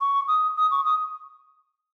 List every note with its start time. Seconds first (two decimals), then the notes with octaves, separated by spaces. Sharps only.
0.01 C#6
0.28 D#6
0.57 D#6
0.71 C#6
0.85 D#6